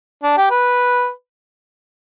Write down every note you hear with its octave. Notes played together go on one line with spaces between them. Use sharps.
D4
G4
B4